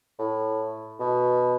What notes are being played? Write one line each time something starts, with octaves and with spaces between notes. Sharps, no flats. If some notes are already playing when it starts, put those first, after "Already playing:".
A2
B2